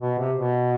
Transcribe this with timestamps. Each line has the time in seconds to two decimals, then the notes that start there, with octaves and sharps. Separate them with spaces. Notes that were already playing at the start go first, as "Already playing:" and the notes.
0.02 B2
0.18 C3
0.37 B2